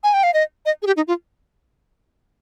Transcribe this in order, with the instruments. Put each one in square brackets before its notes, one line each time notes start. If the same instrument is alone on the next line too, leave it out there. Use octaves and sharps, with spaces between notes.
[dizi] G#5
G5
F5
D#5
D#5
G#4
G4
D#4
F4